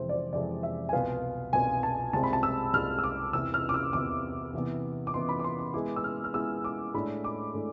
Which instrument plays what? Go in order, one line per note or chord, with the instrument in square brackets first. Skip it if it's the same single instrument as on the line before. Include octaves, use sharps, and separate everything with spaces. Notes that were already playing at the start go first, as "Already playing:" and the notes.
Already playing: [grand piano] F2 C3 E3 G#3 C4 [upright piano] C5
[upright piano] D5
C5
[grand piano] F2 C3 E3 G#3 C4 [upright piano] D5
[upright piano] E5
G#5
[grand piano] C2 B2 B3 F4 B4 [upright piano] F5
[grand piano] C2 B2 B3 F4 B4 [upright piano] G#5
[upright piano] A5
[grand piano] C2 C3 G#3 C4 F4 [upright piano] A5
[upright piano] B5
A5
E6
[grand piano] C2 C3 G#3 C4 F4 [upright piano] F6
[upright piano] E6
D6
[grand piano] E2 C3 E3 B3 [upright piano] E6
[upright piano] F6
D6
E6
[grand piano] E2 C3 E3 B3 [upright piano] D6
[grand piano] C3 E3 B3
[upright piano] D6
[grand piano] C3 E3 B3 [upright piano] C6
[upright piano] B5
D6
C6
D6
[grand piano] G#3 B3 E4 [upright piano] D6
[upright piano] E6
F6
F6
[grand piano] G#3 B3 E4 [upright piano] E6
[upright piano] D6
[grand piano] A2 G#3 D4 A4 D5 [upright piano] B5
[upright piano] D6
[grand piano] A2 G#3 D4 A4 D5